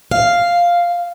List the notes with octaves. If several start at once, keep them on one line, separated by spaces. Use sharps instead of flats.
F5